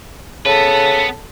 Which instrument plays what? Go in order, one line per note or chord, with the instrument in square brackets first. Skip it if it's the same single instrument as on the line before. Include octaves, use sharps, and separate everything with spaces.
[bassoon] C#3 [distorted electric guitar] B3 B4 [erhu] A4